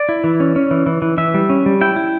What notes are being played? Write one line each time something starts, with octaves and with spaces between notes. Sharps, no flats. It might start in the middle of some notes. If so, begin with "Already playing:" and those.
Already playing: D5
E4
E3
C#4
C#4
E3
E3
E3
E3 E5
G3
C#4
G3
E4 G5
E4